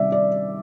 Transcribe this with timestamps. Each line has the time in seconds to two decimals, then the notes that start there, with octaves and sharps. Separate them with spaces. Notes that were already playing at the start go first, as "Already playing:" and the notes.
Already playing: C3 D#3 G3 D5 E5
0.12 D5